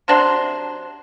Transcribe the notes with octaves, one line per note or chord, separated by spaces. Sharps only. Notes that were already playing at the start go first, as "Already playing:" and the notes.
C3 F#3 D4 C5